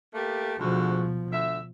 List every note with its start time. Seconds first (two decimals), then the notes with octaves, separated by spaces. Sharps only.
0.14 A3 A#3 G4
0.60 D2 G#2 B2 F3 F#4
1.32 D2 E5